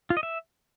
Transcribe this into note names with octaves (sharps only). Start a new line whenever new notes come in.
F4
D#5
E5